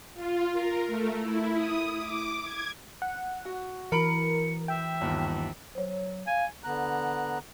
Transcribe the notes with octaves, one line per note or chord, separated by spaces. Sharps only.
F4
A#4
A3
E4
D#6
D6
G#6
F#5
F#4
E3 F#4 A#4 B5 C#7 D7 F#7
E5 G5
G1 D#2
F#3 C5 C#5
F5 G#5
D3 B3 A#5 F#6